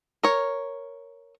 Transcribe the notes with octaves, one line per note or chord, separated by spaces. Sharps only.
A#4 C#5